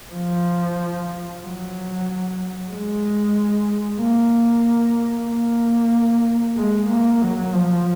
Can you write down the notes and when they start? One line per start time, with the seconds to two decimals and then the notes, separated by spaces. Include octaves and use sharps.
0.14 F3
1.43 F#3
2.72 G#3
4.01 A#3
5.29 A#3
6.57 G#3
6.90 A#3
7.22 F#3
7.55 F3